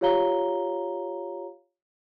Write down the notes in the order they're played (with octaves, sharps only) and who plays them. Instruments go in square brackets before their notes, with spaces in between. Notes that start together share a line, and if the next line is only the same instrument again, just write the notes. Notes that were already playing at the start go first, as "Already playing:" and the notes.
[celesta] F4 G4 C#5 F5 A#5 G7